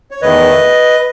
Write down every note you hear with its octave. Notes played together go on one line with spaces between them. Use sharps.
C#5
E2 D#3 A3 B4 D#5